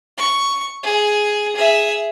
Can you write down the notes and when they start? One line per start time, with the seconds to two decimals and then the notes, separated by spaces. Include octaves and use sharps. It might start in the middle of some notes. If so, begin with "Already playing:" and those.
0.18 C#6
0.83 G#4
1.55 G#4 E5